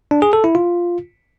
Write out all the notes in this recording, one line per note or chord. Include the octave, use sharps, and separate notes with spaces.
D4
G#4
A4
E4
F4